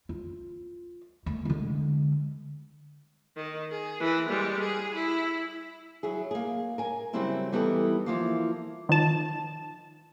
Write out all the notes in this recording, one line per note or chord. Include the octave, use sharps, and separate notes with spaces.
F4
A3
D3 G#3
D#3
G#4
E3 A#4
G3 G#3
G#4
E4
F#3 E4 G#4
A#3 G#4
A#4 G#5
C#3 F#3 G3 C4 E4 A#4
E3 G3 B3 D#4 G4 A4
E3 F3 A#3
D#3 F3 A5